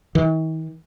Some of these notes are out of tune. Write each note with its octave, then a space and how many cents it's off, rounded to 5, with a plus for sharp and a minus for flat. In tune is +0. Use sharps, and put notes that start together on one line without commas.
D#3 +45